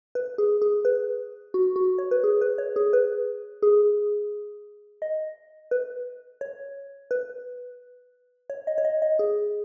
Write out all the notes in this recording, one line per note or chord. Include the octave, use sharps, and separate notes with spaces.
B4
G#4
G#4
B4
F#4
F#4
C#5
B4
G#4
B4
C#5
G#4
B4
G#4
D#5
B4
C#5
B4
C#5
D#5
C#5
D#5
D#5
G#4